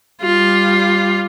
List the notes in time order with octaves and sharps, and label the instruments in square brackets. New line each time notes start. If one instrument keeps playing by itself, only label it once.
[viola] G3 F4